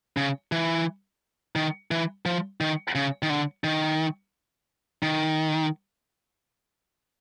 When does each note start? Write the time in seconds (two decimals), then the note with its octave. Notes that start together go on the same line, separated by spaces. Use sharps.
0.17 C#3
0.52 E3
1.56 D#3
1.91 E3
2.26 F3
2.61 D#3
2.95 C#3
3.23 D#3
3.30 D3
3.64 D#3
5.03 D#3